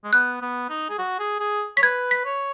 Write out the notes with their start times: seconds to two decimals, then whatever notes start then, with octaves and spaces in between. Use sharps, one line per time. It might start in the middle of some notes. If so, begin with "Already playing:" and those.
0.04 G#3
0.13 B3 F#6
0.42 B3
0.70 D#4
0.90 G#4
0.98 F#4
1.19 G#4
1.40 G#4
1.77 C#5 B6
1.82 B4 G#6
2.11 B6
2.25 C#5